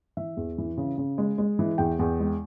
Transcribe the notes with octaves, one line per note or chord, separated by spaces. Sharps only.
E3 E5
E2
E3
C#3
C#3
G#3
G#3
E3
E2 G5
E2
G#3